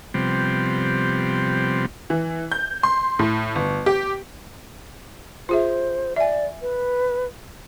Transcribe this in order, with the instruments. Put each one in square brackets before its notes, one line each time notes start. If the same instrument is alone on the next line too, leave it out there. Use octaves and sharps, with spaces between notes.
[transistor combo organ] C3 F3 G3 B3 C4
[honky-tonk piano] E3
G6
C6
A2
G1
G4
[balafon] F4 G#4 E5 [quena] C5
[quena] D5 [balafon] E5 G#5
[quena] B4